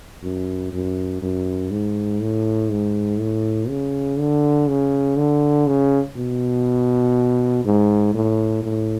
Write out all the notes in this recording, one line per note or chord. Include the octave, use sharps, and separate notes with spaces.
F#2
F#2
F#2
G#2
A2
G#2
A2
C#3
D3
C#3
D3
C#3
B2
G#2
A2
A2